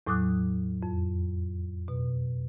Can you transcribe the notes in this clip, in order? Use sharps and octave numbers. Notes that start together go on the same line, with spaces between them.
E2 A2 F#3 D6 D#6 F#6
F2
B2